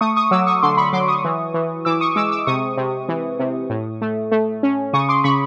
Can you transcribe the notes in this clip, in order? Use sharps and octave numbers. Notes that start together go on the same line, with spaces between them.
A3 C#6 D#6
C#6 D#6
F#3 D6 E6
C#6 D#6
D3 C6 D6
B5 C#6
F#3 C6 D6
C#6 D#6
E3
E3
E3 D6 E6
C#6 D#6
G#3 D6 E6
D6 E6
C3 C#6 D#6
C3
E3
C3
A2
A3
A3
C#4
C#3 C#6 D#6
C6 D6
C#3 B5 C#6